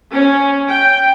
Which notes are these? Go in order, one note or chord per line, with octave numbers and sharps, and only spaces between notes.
C#4
G5